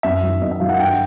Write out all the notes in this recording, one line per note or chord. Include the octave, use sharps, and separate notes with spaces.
F#2 E5
D#3 F#3
F#2 D#5
E5
D#3 F#3 F5
F#5
G2 G5